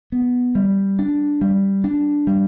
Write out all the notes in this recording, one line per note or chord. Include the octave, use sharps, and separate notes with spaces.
B3
G3
D4
G3
D4
G3